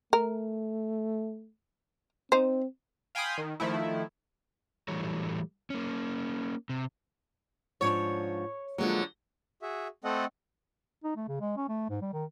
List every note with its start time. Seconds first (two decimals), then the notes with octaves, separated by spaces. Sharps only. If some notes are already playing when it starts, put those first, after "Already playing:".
0.13 A3 A#4
2.32 C4 D#4 C5
3.15 F5 G5 G#5 B5 C6 D#6
3.38 D#3
3.60 D#3 F3 A3 E4
4.88 A2 E3 F#3 G3 A3 C#5
5.70 A#3 C#4
6.69 C3
7.81 G#2 F3 D4 C#5
8.78 D3 F3 F#3 G#3 A#3
9.62 F#4 G#4 E5
10.04 A3 C4 A4 D#5 F#5
11.04 D#4
11.16 A3
11.28 C#3
11.41 G#3
11.57 C#4
11.68 A3
11.90 G#2
12.01 G3
12.13 D#3